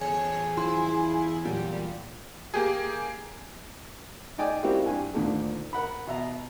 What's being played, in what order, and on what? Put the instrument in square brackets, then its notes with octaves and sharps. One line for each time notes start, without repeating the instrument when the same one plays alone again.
[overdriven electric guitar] E2 A4 [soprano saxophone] G#4 [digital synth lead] C#5
[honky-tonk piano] F3 G#5 C6 [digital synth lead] E4
[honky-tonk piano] A#2 F#3 F#4 [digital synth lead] G3
[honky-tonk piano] A#3 G4 G#4
[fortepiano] D#4 D5 G5 G#5 D6
G3 A#3 C4 E4 F#4 G4
G2 G#5
D2 A#2 D3 D#3
A#4 F#5 B5
B2 E5 A#5